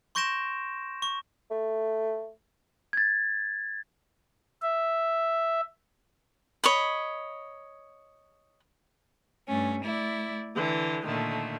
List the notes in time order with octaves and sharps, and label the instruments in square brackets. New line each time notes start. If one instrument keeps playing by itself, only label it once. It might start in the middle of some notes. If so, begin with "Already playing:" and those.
[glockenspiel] C6 C#6 G6 A#6 D7 E7
C#6
[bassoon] A3
[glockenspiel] G#6 A6
[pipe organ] E5
[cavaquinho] C#5 D#5 B5
[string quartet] G2 A3 C#4
A3 E4 D5
D3 E3
A#2 D3 D#3 A3